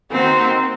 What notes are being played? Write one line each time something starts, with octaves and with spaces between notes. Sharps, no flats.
D#3 A#3 C4 D#4 F#4